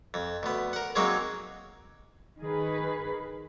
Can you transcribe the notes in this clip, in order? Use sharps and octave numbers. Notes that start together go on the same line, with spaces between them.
F2
D2 B3
A#4 F#5
F#3 G#3 A#3 C4 C#4 D#4
D#3 G#4 B4